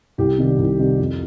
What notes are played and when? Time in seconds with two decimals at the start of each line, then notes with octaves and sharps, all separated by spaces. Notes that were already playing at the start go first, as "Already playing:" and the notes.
0.18 C2 G4
0.38 C3 D#3 G3
0.58 C2
0.79 C3 D#3 G3
0.99 F2